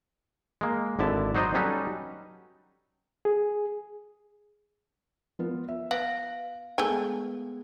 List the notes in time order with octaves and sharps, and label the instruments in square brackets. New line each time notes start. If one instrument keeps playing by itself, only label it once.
[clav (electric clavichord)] G#3 A#3
G#1 D3 E4 A5
F#3 D#4 C5 D5 D#5
F#3 G3 C#4 D#4 A4 B4
[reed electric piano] G#4
[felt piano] F3 B3 F4
E5
[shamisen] B3 [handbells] F5 [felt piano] D7
[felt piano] G#3 B3 [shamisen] A3 G5 G#5